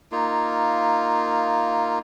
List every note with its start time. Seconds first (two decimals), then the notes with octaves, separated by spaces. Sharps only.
0.12 A#3 D#4 F4